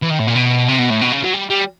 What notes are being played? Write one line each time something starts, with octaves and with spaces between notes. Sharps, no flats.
E3
D#3
A2
A#2
B2
C3
B2
A2
B2
C#3
F#3
G3
G3